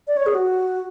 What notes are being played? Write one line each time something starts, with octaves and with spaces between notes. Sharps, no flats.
D5
C#5
G#4
F#4